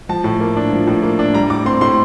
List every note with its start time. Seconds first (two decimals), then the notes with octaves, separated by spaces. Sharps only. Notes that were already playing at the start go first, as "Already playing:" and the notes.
0.09 F3 A5
0.24 A2
0.41 A#3
0.56 D4
0.72 F3
0.87 A2
1.03 A#3
1.19 D4
1.34 G3 A#5
1.50 A2 D6
1.66 C4 C6
1.81 A2 C6